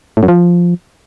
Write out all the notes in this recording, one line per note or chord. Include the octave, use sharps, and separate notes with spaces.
A2
F#2
F3